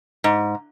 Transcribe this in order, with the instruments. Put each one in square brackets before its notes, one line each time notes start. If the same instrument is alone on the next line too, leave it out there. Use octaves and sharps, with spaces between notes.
[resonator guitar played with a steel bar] G#2